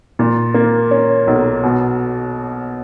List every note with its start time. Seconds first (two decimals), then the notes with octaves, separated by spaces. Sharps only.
0.19 A#2
0.54 A#3
0.91 C#4
1.27 B1
1.63 B2